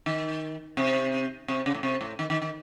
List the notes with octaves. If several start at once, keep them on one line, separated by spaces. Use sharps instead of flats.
D#3
C3
C3
C#3
A2
C3
A2
D#3
D#3
D#3